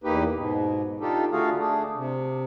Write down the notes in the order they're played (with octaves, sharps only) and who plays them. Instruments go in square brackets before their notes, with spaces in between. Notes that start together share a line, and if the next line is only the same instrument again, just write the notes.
[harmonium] E2 A#3 D#4 G4 B4
G#2 B2
D4 D#4 F4 G4 A4
D3 A3 F4 F#4 G#4 F5
A3 D4 G#4
C3